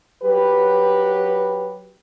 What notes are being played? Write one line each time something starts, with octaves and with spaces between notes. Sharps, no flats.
F#3 G4 B4